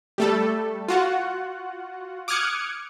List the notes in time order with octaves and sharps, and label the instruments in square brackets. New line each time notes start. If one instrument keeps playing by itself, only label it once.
[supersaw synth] G3 A3 A4
F4 F#4 F#5
D6 D#6 F6 F#6 G#6 C#7